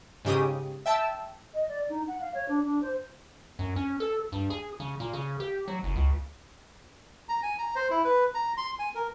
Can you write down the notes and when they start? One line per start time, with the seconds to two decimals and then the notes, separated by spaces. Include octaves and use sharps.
0.25 G#2 C#3 G4 D#6
0.86 E5 G5 A5 E6
1.54 D#5
1.68 D5
1.90 D#4
2.08 F#5
2.21 F5
2.35 C#5
2.49 D4
2.65 D4
2.82 C5
3.59 F#2
3.76 C#4
4.00 A4
4.32 G2
4.50 G#4
4.80 C#3
5.00 A#2
5.13 C#3
5.40 G4
5.68 F#3
5.83 F#1
5.96 C#2
7.29 A#5
7.43 G#5
7.58 A#5
7.75 C5
7.90 E4
8.04 B4
8.35 A#5
8.57 C6
8.79 G#5
8.95 A#4